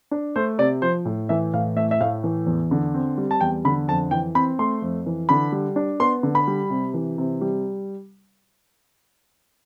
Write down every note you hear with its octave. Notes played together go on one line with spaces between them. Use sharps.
D4
A3 C5
C3 D5
F3 C5
A2
E3 E5
A2 F5
A3 E5
E5
A2 F5
E3
E2
D3
C4
G3
A5
E2 G5
D3 B5
F2 A5
E3 G5
C4 B5
A3 C6
F2
E3
D3 B5
G3
D4
B3 C6
D3
B5
G3
C3
E3
C3
G3